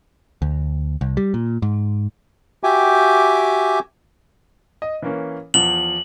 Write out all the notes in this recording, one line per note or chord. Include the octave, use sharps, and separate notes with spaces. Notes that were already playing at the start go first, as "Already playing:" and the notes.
D2
C2
G3
A#2
G#2
F#4 G4 E5 G5 G#5 D6
D#5
E3 A#3 C#4
E2 F3 F#7